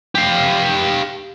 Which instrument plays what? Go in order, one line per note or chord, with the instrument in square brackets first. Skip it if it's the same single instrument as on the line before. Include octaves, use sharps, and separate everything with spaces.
[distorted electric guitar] G4 F5